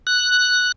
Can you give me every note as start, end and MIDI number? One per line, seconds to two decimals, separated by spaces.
0.07 0.72 90